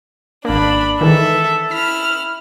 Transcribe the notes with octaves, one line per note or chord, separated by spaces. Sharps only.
G#1 A#3 D4 B5
D#3 E3 G#3 A4 E5
E4 F6 B6